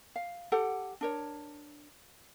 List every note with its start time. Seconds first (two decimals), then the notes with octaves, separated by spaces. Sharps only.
0.16 F5
0.52 G4 A4 F#5
1.01 D4 A#4 C#5